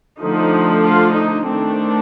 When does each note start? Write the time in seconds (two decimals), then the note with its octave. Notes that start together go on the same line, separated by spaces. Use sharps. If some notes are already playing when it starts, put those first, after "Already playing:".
0.20 D3 F3 A3 D4 D#4
0.83 F4
1.15 D#4
1.46 D#3 A3 C4 D4